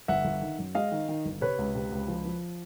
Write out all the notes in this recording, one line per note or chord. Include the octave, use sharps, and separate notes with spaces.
G1 E5 F#5
G1
D#3
F#2
G#3 D#5 F5
D#3
D#3
G1
C3 B4 C#5
C#2
C3
C#2
F3
F3